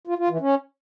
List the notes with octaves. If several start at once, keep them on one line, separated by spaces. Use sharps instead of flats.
F4
F4
E3
C#4